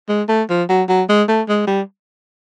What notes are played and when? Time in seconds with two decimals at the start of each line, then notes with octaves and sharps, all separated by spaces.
0.09 G#3
0.29 A3
0.50 F3
0.69 F#3
0.89 F#3
1.09 G#3
1.28 A3
1.49 G#3
1.67 G3